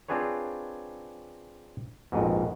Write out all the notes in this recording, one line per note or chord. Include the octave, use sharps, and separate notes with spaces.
C4 D4 F4 G#4 B4 C#5
A#1 F2 G#2 B2